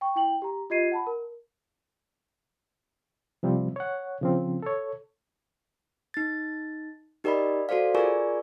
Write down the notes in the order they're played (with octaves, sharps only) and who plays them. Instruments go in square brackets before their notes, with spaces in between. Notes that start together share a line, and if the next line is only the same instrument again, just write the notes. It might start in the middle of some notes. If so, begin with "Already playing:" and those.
[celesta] G5 C#6
E4 G5 F#7
G4 A#5
F4 G4 D#5 G#6 C7 D#7
F#5 A5 B5
A#4
[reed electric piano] C3 F3 G3 C4
C#5 F#5
C#3 F3 C4
A4 C#5
[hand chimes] D#4 A6
D#4 G4 A#4 D5 D#5 B5
F#4 A4 C5 D5 F5
F4 G#4 A#4 D5 G#5 C#6